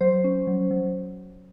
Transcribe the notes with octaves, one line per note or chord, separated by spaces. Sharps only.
F#3 C5
C#4
F#3
F#3